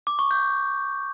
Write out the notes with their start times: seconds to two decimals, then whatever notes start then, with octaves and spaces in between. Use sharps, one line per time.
0.07 D6
0.19 C#6
0.31 G6